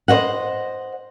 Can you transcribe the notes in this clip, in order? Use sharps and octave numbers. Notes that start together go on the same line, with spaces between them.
C5 C#5 D#5 F#5